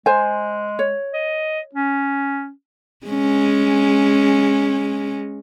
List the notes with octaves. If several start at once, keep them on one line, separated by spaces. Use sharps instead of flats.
G#3 C5 G#5
C#5
D#5
C#4
G#3 C#4